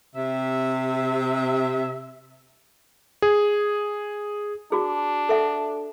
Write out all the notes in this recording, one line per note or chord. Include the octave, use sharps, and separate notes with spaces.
C3 E5
G#4
D4 F#4 G#4
A4 E5 F#5